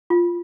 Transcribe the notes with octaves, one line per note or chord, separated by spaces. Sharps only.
F4